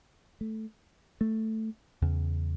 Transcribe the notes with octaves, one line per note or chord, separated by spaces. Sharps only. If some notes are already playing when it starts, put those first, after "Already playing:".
A3
A3
E2 C#3